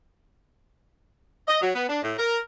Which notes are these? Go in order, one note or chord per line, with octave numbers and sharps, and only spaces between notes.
D#5
F#3
B3
D4
A2
A#4